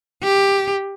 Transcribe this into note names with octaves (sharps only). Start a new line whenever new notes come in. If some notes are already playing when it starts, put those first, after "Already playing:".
G4